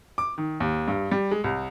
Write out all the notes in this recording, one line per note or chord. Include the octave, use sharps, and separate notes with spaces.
D6
D#3
D#2
G2
G3
G#3
C2